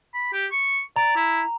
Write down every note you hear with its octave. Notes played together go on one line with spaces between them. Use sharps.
B5
G4
C#6
D5 A#5
E4